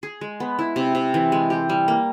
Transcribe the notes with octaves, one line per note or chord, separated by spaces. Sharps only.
G#4
G#3
B3
E4
C3
C3
E3
G#3
G4
G3
A#3